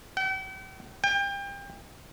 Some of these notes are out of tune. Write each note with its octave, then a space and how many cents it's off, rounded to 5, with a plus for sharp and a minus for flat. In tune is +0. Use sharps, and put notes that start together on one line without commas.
G5 -45
G5 +30